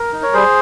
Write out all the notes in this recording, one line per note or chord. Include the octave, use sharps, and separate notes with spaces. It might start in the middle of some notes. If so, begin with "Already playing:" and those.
Already playing: A#4
D#4
C#5
G3 G#4 C5